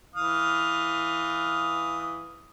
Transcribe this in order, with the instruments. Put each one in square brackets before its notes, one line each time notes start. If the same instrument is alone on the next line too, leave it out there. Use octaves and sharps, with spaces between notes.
[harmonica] E3 F5 D#6